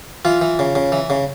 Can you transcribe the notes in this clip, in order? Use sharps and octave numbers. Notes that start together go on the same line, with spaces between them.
E3 F4
E3
C#3
C#3
E3
C#3